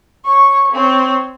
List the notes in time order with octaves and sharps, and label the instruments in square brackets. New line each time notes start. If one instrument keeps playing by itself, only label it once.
[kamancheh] C#5 C#6
C4 C#5